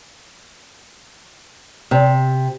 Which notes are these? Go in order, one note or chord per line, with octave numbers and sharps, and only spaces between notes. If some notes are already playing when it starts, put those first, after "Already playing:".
C3